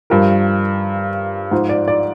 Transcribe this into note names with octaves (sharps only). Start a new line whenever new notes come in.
G2 F3 A#4
G#2 F3
D5
D5